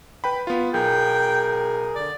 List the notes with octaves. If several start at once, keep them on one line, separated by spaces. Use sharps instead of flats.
B4 G5 B5
B3 F4
B1 G#4 A#4 G5
D3 D5